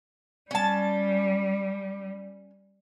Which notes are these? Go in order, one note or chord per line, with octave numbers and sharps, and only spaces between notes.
G3 C#4 A5